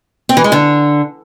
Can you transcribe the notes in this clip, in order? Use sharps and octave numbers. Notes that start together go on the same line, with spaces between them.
C4
E3
G#3
D3